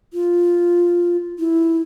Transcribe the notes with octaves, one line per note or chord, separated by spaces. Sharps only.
F4
E4